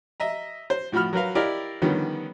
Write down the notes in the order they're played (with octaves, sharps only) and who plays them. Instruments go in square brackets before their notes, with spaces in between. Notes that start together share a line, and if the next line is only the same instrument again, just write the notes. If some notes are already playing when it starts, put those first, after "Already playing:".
[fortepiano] D#5 E5 A#5
C5
A2 F3 F#4 B5 F6
F#3 A#4 B4 F5
E4 G4 A#4 D5 D#5 F5
D3 D#3 F3 G3 B3 C#4